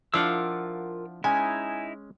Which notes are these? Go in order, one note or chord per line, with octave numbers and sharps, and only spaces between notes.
F3 D4 E4 F4 A#4 F5 F#5 E6
G#3 C#4 D#4 E4 G#5